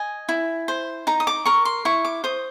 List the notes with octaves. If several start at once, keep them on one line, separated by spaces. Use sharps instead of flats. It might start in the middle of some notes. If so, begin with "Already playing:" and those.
Already playing: D#5 G#5
E4
C5
D#4 A#5
D#6
D6
A#4 C#6
C6
E4 C#6
D6
C5 D#6